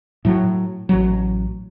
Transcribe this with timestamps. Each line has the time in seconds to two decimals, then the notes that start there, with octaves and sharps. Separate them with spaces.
0.25 A2 F#3
0.89 A1 F#3